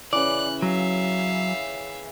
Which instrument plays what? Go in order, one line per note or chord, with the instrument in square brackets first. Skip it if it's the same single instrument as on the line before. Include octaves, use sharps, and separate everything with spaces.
[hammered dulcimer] C#3 E3 [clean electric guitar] D5 [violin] F#6
[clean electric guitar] F#3 [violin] E5 F5